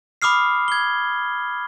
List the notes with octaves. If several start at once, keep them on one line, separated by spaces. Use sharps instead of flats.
B5 D6 D#6 F6 C7
G#6 G7